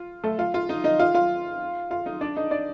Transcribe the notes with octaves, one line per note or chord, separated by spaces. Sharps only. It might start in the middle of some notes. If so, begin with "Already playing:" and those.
Already playing: F4
A3 A4
F4 F5
F4 F5
D#4 D#5
D#4 D#5
F4 F5
F4 F5
F4 F5
D#4 D#5
D4 D5
D#4 D#5
D4 D5